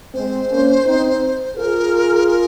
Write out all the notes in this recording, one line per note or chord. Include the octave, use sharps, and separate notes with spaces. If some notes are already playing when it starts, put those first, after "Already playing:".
G#3 C4 C5
A#3 C#4
C4 D#4
F4 G#4 A#4
A#4